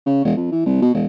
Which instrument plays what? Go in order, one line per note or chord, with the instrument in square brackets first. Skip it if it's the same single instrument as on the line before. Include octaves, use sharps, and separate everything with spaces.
[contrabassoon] C#3
E1
F2
E3
C2
B2
E1